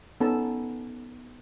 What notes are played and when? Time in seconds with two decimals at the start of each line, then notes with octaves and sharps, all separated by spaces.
0.20 B3 C#4 D#4 A4 A5